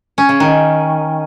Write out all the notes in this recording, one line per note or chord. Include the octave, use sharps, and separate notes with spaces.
C#4
C#3
D#3